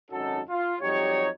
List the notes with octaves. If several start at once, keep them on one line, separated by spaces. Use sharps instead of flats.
G#1 F#2 C#4 D#4 F#4 A4
F4
F2 F#3 G3 D#4 G4 C#5